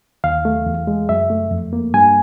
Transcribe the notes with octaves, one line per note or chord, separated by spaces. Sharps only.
D#2 F5
A3
E2
G#3
F#2 E5
A3
F2
A#3
G2 G#5